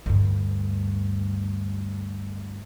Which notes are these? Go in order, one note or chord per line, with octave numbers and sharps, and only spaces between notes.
D2 G2